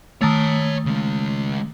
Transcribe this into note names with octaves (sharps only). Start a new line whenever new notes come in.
D#3 A3 C#5 A5
C#3 G#3